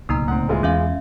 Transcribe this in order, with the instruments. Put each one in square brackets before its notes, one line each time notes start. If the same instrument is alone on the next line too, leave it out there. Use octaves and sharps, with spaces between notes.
[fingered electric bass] D1 C#2 B2 [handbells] A#3 D#4 A#5 [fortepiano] D#6
[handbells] A3 [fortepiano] C4 F#5
[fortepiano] E3 G#3 F4
[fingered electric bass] E2 [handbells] C#4 E5 F5